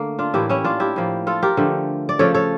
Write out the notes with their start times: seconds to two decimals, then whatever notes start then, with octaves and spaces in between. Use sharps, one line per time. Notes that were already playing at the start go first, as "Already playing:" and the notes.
Already playing: D3 A3 A#3
0.19 D4 F4
0.34 A2 E3 A#3 E4 G4
0.49 C#4 E4
0.64 D4 F4
0.80 E4 G4
0.96 A2 F3 A#3
1.27 F4 A4
1.43 G4 A#4
1.57 D3 F3 A3
2.09 D5
2.19 C#3 F3 A3 A4 C#5
2.34 A4 C#5